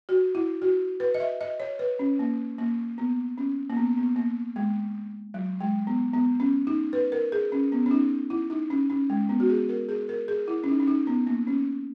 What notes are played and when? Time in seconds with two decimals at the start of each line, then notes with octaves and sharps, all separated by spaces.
0.09 F#4
0.35 E4
0.62 F#4
1.00 B4
1.14 D#5
1.20 E5
1.41 D#5
1.60 C#5
1.79 B4
1.99 C#4
2.19 A#3
2.58 A#3
2.98 B3
3.38 C#4
3.70 A#3
3.77 B3
3.97 B3
4.16 A#3
4.56 G#3
5.34 F#3
5.60 G#3
5.87 B3
6.13 B3
6.40 C#4
6.67 D#4
6.93 B4
7.12 A#4
7.32 G#4
7.52 C#4
7.72 B3
7.86 C#4
7.91 D#4
8.30 E4
8.50 D#4
8.70 C#4
8.90 C#4
9.10 G#3
9.29 B3
9.40 F#4
9.50 G#4
9.69 A#4
9.89 G#4
10.09 A#4
10.28 G#4
10.48 E4
10.64 C#4
10.68 D#4
10.80 C#4
10.87 D#4
11.07 B3
11.27 A#3
11.47 C#4